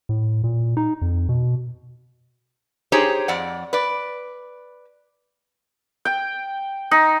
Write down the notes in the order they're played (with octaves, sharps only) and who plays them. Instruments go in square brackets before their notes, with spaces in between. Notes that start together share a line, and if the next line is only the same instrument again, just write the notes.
[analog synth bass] A2
A#2
D#4
F2
B2
[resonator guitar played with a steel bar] D#4 G4 G#4 C5 C#5
F2 D5 F#5
B4 D5
[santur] G5
D#4